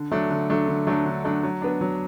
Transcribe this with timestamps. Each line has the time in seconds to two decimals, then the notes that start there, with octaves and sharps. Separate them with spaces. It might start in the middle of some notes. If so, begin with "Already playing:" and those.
Already playing: D3
0.11 F#3 A3 D4
0.30 D3
0.50 F#3 A3 D4
0.68 D3
0.87 F#3 A3 D4
1.06 D3
1.24 F#3 A3 D4
1.43 F#3
1.62 B3 D4
1.81 F#3